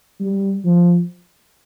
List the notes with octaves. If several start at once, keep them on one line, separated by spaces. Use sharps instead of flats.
G3
F3